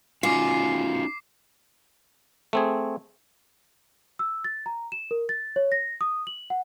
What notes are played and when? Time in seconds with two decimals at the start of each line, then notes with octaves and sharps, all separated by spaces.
0.23 C#4 D#4 F4 F#4 G#5 D6 C7
2.53 A3 C4 G#4
4.19 E6
4.44 A6
4.66 A#5
4.92 E7
5.11 A#4
5.29 A6
5.56 C#5
5.72 A#6
6.01 D#6
6.27 F#7
6.50 F#5